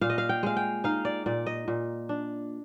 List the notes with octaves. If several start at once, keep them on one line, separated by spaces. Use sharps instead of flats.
A#2 F5
D#5
F5
G5
G#3 F5
G5
D#4 F5
D5
A#2 D5
D#5
A#2
D4